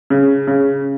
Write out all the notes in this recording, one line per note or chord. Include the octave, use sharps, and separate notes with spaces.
C#3
C#3